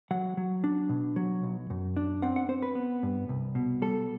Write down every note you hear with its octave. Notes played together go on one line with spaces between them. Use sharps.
F#3 F#5
F#3
D4
B2
F#3
B1
F#2
D4
C4 F#5
F#5
C4 C5
B4
B3
G2
C2
B2
G3 A4